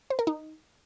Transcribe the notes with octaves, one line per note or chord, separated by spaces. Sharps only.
C5
A#4
D#4